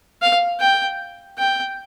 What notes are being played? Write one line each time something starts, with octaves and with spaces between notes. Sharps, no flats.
F5
G5
G5